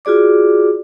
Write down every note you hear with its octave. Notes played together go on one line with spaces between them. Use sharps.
F4 F#4 G#4 D5 D6